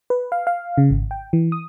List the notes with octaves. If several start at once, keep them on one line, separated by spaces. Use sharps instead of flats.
B4
F5
F5
C#3
G#1
G5
E3
D#6